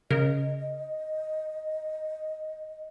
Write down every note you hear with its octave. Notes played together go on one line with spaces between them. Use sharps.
C#3 A#4 D#5